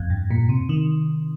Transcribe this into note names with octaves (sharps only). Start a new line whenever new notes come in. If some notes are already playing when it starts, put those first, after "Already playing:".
Already playing: F2
G2
A#2
C3
D#3